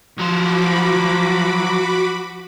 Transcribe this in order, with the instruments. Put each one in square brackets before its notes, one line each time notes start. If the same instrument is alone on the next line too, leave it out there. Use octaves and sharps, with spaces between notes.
[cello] F3 [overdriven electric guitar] F#3 C5 [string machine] F#4 B5 D6